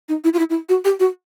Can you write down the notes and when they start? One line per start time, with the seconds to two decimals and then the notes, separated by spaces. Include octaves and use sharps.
0.09 D#4
0.24 E4
0.33 F4
0.39 E4
0.50 E4
0.69 F#4
0.85 G4
1.00 F#4